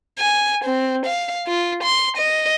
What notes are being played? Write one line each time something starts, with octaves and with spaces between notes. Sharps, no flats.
G#5
C4
F5
F4
C6
D#5